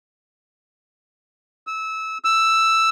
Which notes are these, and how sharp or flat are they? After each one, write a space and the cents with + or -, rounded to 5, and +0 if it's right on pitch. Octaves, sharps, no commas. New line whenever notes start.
E6 -20
E6 +5